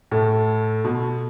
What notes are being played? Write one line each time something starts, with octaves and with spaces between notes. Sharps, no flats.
A2 A4
B2